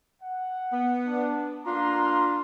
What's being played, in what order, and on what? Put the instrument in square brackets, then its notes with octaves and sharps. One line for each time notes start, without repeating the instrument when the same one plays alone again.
[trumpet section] F#5
[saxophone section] B3
[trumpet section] D4
[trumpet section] A#3 A#5 C6 [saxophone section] D4 F4